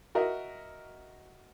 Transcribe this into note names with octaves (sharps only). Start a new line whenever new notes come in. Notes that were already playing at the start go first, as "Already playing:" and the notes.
F#4 A#4 D#5 E5